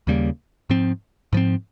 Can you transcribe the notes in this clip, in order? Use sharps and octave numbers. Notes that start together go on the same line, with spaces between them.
D#2 C#3 G3 A#3
G#2 F3 C4
G#2 F3 C4